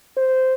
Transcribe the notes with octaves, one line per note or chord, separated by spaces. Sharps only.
C5